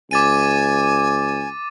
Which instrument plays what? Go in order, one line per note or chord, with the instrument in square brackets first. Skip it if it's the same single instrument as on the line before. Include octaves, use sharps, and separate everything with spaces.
[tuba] C#2 [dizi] G#5 [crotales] D6 A6 D#7